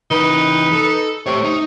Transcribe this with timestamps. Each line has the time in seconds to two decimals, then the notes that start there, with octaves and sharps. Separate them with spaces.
0.11 E3 D#4 A#4 B4
0.72 A4
1.26 C3 A3 C#5 C#6
1.44 D#4